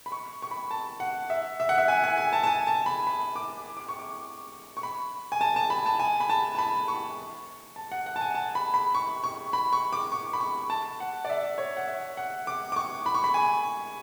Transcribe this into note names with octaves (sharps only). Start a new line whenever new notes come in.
B5
C#6
C#6
B5
A5
F#5
E5
E5
F#5
E5
G#5
G#5
G#5
A5
A5
G#5
A5
B5
B5
D6
D6
C#6
D6
C#6
B5
G#5
A5
A5
B5
A5
G#5
B5
A5
A5
B5
C#6
A5
F#5
F#5
A5
G#5
A5
B5
B5
C#6
C#6
B5
C#6
D6
C#6
B5
C#6
A5
F#5
D5
E5
C#5
F#5
E5
F#5
D6
D6
C#6
B5
C#6
B5
G#5